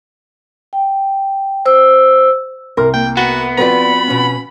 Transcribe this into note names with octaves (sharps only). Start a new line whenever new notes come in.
G5
C5 E6
C2 A#4 C6 F6
A#3 G5
B3 F#4
F3 C4 F#4 B4 C5 D5 B5
B2 C#4